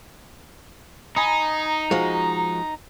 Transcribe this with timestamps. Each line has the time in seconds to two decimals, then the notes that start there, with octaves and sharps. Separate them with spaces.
1.16 D#4 G#5 A#5 B5 D#6
1.91 F3 G#3 F#4